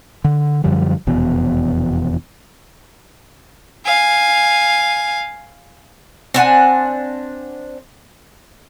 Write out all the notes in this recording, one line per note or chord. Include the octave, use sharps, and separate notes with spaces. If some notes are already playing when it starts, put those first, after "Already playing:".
D3
F#2 D3 F3 G3
F1 E2 B2
F5 G#5
C4 D4 F#5 G#5